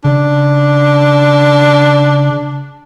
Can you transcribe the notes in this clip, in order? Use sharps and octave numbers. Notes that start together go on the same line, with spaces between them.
C#3 D4